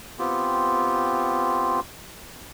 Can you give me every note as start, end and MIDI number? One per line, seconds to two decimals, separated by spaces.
0.19 1.80 59
0.19 1.80 60
0.19 1.80 65
0.19 1.80 67